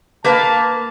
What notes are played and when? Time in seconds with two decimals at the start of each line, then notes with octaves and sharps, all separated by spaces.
0.24 A#3 B4 F5 A5